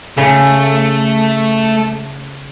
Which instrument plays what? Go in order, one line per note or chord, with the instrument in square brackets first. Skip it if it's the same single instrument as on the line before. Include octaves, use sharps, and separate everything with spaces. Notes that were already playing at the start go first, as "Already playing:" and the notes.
[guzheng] C#3 [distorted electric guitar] A3